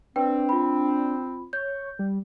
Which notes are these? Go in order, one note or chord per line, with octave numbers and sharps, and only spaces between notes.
C4 D4 B4 G5
F4 B5
C#5 G6
G3